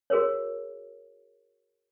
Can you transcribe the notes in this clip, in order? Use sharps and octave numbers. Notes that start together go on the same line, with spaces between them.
F#4 G#4 A#4 C5 C#5